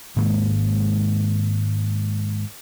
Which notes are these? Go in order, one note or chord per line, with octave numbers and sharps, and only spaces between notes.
G#2 D#3 G#3 A#3